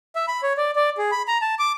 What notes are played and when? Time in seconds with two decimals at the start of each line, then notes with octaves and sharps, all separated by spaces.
0.16 E5
0.28 B5
0.43 C#5
0.57 D5
0.76 D5
0.98 G#4
1.12 B5
1.28 A#5
1.42 A5
1.59 D6